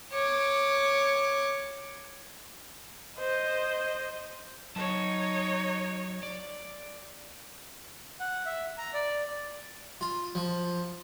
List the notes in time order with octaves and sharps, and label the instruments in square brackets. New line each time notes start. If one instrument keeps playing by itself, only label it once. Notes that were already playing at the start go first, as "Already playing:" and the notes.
[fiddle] C#5 D6
[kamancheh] C5 D#5
[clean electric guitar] F#3 A5 [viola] D#4 C#5
[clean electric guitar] D5
[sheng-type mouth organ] F#5
E5
A#5
D5
[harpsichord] F4
F3